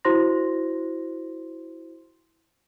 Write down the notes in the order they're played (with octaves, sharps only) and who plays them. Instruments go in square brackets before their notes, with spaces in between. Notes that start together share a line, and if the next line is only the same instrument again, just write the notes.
[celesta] E4 F#4 C5 C6 A#6